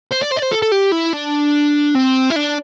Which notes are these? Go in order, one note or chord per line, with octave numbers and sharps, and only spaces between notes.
C5
D5
C5
D5
C5
A4
A4
G4
E4
D4
C4
E4
D4